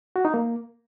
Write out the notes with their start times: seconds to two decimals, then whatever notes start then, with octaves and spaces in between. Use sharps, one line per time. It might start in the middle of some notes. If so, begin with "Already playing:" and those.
0.16 F#4
0.25 D#4
0.34 A#3